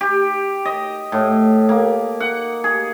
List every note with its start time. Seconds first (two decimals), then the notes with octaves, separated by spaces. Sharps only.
0.01 G4
0.65 D#5
1.12 A2
1.69 A#3
2.20 F#5
2.64 G#4